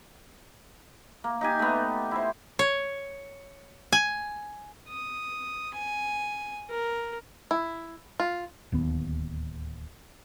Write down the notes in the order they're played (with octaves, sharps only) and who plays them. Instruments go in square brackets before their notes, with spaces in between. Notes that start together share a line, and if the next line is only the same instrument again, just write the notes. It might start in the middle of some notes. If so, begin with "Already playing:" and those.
[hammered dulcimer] A#3
D#4 G4 G#5
A3 B3
E4 C5
[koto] C#5
G#5
[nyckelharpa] D#6
G#5
A#4
[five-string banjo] E4
F4
[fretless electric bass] D1 D#2 B3